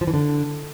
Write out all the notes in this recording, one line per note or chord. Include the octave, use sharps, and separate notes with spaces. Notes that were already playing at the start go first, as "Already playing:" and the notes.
F3
E3
D3